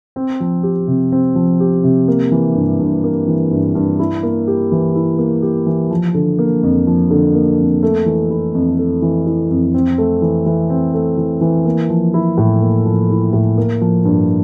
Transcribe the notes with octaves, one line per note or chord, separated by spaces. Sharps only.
C4
F3
G4
C3
C4
F3
G4
C3
A#3
E3
G2
G2
A#3
E3
G2
G2
E4
A#3
G4
E3
E4
A#3
G4
E3
F3
D3
A#3
F2
F3
D3
A#3
F2
A3
E3
E4
F2
A3
E3
E4
F2
C4
A3
E3
E3
C4
A3
E3
E3
A#3
F3
E4
A2
A#3
F3
E4
A2
A#3
F3
G2